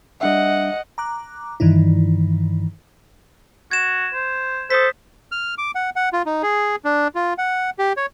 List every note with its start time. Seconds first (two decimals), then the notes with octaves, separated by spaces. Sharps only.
0.21 G3 D4 D#5 E5 F#5
0.98 A#5 D6 F#6
1.60 G2 D#3 E3 D#4 E4
3.71 F#4 G#6 E7
4.13 C5
4.70 A4 C5 D#6 B6
5.32 F6
5.58 D6
5.75 F#5
5.96 F#5
6.13 F4
6.26 D#4
6.43 G#4
6.85 D4
7.15 F4
7.38 F#5
7.79 G4
7.97 C#5